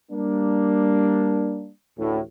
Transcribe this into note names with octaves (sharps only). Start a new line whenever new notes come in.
G3 A#3 D4
A1 D2 A2